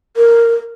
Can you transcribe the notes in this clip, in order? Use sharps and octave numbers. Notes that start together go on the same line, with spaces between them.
A#4